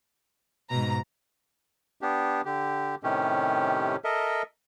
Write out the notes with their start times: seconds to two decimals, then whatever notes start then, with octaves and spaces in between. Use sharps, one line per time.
0.70 G#2 B2 A#5
2.01 B3 D4 G4
2.45 D3 G4
3.03 A2 C3 D#3 C#4 G4
4.04 A4 A#4 D#5 E5